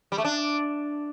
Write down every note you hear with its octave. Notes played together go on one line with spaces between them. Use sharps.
G3
A3
D4